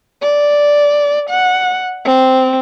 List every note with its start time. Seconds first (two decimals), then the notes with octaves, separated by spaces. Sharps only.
0.22 D5
1.30 F#5
2.05 C4